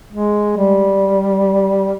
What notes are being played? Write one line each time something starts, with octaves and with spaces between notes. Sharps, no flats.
G#3
G3